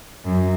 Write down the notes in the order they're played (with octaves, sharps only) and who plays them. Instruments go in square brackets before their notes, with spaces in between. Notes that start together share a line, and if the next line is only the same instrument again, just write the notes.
[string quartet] F#2